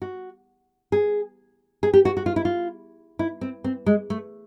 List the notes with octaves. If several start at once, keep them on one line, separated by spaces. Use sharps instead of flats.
F#4
G#4
G#4
G4
F#4
F#4
F4
E4
F4
E4
C4
C4
G#3
A3